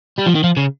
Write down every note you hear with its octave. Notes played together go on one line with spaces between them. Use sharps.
G3
F3
D#3
F3
C#3